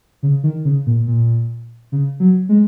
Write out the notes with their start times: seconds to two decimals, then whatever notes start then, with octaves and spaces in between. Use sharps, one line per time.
0.23 C#3
0.43 D#3
0.65 C#3
0.86 A#2
1.08 A#2
1.92 C#3
2.20 F#3
2.49 G#3